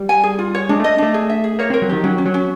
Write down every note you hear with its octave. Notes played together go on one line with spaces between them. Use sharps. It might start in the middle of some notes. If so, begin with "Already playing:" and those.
Already playing: G3
G#5
G#4
F4
C#5
G#3 D4
A3 D#5
A3 D4
G#4
E5
G#4
A#3 C#5
C4 A#4
F#3
D#3 G4
F#3 C#4
C#4
F#3
C#4